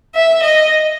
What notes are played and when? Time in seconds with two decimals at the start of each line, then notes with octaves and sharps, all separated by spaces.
0.15 E5
0.43 D#5